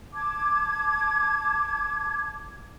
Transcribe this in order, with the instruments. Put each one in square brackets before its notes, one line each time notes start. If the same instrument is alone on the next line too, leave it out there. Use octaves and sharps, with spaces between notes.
[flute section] A5 D6 G#6